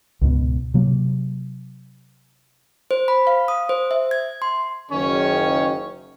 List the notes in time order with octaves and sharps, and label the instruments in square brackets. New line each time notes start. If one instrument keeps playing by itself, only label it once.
[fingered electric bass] C#2 G#2 B2
C3 F#3 A#3
[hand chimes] C5
B5
F5
D#6
C5
E5
G#6
C6
[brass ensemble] F#1 D#3 [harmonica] C#4